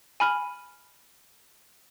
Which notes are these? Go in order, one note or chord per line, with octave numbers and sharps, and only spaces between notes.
G#5 B5 F6